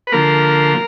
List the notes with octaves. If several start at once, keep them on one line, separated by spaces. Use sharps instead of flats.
B4
D3 F3 A#3 A#4